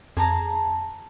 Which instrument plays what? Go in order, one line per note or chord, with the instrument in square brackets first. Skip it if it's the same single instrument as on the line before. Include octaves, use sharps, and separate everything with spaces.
[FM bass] F2 [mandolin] G#4 A5 A#5